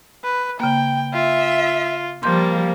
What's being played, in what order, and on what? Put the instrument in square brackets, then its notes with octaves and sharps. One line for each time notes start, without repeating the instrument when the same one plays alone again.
[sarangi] B4
[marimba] C#3 A#3 [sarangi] G5
[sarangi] F4 [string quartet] E5
[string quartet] F3 G3 [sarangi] A#3 [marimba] C6 G6